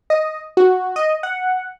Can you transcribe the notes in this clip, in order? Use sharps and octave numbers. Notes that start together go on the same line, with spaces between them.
D#5
F#4
D#5
F#5